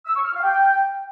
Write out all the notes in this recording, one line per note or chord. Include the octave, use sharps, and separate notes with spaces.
E6
C#6
F6
F5
G5